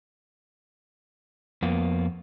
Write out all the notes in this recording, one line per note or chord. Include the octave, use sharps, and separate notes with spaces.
F2 A#3 B3